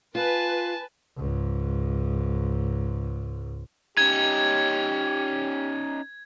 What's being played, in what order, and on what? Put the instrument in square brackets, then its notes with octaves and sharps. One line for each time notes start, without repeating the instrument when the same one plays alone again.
[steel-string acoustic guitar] F4 [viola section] B4 [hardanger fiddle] G#5 A5
[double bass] C#2 G#2
[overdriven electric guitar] C#4 D#4 [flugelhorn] G4 [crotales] G#6